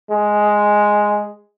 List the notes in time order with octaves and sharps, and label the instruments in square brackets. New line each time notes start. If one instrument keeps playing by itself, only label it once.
[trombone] G#3